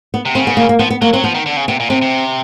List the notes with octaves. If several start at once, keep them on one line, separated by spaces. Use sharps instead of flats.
B3
C3
C#3 C4
B3
A#3
A#3
F3 B3
B3
F#3 A#3
F#3 C4
F3 B3
D#3
D3
C#3
C3 B3
A#2
C3 C4
C3